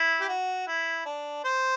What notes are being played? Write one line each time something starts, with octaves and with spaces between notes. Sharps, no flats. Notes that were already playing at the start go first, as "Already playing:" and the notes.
Already playing: E4
G4
F#4
E4
D4
C5